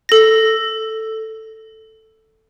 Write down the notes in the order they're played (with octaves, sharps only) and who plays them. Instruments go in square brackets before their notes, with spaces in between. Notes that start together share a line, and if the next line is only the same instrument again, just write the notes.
[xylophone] A4 A#6